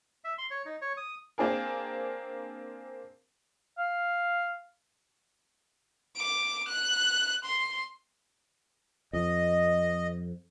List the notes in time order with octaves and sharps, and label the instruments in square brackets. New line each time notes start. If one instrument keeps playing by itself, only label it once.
[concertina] E5
C6
C#5
D#4
C#5
D#6
[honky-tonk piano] A#3 C4 D4 G#4 A#4
[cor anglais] F5
[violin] D6
F#6
C6
[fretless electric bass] F2 [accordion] D#5